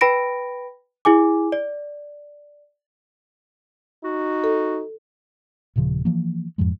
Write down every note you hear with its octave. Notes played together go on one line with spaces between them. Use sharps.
B4 G5 B5 A#6 D7
E4 G#4 G#5 D6
D5
D#4 F#4
A4
D#1 A#2 C#3 F3
E3 F3 A#3
F2 G#2 F3 G#3